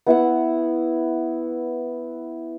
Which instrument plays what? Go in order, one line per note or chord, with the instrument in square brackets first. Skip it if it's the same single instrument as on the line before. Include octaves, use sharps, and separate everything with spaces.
[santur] B3 E4 E5 F#5